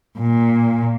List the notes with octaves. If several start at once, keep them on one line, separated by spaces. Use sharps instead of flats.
A#2